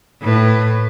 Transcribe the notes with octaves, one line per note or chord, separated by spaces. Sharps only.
A2 B4